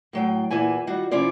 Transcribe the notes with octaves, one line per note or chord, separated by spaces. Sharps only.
A2 F#3 G5
E2 A#2 E3 E4 G#5
D#3 G3 F4 F#4
C3 F3 C#4 E4 F4 D5